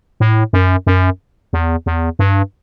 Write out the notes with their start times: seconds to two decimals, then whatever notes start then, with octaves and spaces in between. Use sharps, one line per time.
0.20 A2
0.53 F#2
0.87 F#2
1.53 E2
1.86 E2
2.19 G2